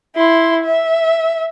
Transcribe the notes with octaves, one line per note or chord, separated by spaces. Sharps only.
E4 C6
E5